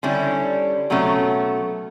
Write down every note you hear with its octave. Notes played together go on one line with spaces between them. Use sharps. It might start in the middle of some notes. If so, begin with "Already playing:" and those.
D3 G3 C#4 E4
B2 F#3 A3 C#4